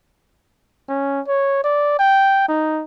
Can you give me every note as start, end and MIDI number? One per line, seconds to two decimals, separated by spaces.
0.89 1.20 61
1.27 1.62 73
1.64 1.98 74
1.99 2.45 79
2.48 2.84 63